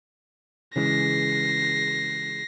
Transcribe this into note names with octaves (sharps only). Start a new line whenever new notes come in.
C#3 E3 G#3 A#6 C7